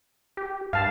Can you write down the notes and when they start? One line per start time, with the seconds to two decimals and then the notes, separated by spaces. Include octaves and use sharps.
0.37 G4
0.73 G2 F5 A5